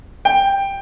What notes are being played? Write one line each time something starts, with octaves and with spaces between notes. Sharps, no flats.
G5